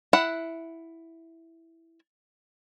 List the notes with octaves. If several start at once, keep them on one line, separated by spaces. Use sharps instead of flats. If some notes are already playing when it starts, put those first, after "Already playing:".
E4 F#5